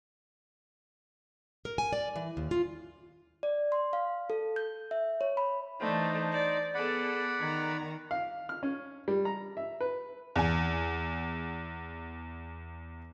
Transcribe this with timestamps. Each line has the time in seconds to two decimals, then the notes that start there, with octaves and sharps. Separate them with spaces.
1.65 A#4
1.78 G#5
1.93 D5
2.16 E3
2.37 D#2
2.51 F4
3.43 D5
3.72 C6
3.93 F5
4.30 A4
4.56 G6
4.91 E5
5.21 C#5
5.37 B5
5.81 E3 A3 D4 D#4 C5
6.32 D5
6.74 B3 G#4 A4 D5 F#5 B5
7.40 D#3 A#5
8.11 F5
8.49 F6
8.63 C#4
9.08 G3
9.25 A#5
9.57 E5
9.81 B4
10.36 E2 G#5